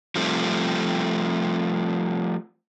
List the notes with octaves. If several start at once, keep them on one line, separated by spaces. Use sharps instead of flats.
F3 G3 A3 C4